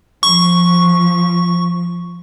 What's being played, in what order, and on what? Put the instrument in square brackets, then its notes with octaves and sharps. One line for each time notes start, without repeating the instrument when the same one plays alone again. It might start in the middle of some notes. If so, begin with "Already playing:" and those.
[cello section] F3 [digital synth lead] C#6